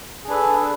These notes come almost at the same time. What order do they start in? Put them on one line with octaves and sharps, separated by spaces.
G#4 D4 B4 A4